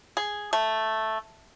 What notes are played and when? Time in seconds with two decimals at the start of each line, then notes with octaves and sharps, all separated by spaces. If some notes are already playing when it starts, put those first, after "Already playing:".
0.17 G#4
0.53 A3